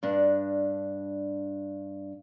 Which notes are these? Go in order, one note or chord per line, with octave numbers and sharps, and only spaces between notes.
G2 D4